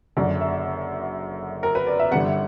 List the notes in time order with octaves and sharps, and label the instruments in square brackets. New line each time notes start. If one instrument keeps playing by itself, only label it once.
[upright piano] F#1 F#2 D3 D5
E5
A#4
B4
D5
E5
G1 G2 D3 F#5